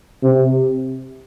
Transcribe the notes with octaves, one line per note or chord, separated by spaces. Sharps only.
C3